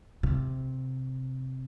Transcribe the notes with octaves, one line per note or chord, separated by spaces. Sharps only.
C3